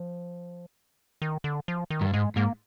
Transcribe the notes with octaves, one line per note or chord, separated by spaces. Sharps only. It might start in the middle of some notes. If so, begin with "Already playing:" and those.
Already playing: F3
D#3
D3
F3
D#3
G2
G#2 G#3
G#2 A#3